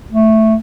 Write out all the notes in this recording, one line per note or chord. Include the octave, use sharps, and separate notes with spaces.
A3